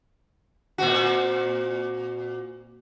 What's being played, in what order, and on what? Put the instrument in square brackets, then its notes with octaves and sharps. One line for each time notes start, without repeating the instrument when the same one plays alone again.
[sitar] A#2 C4 F#4